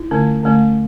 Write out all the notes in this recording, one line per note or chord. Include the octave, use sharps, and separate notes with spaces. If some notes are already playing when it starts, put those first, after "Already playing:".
Already playing: E4
D3 A3 C#4
D3 A3 C#4